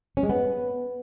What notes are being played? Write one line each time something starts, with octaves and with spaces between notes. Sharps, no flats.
C#4
G#3
B3